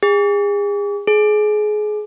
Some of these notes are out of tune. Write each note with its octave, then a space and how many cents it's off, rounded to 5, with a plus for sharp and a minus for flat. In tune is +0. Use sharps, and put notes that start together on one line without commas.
G#4 -35
G#4 +25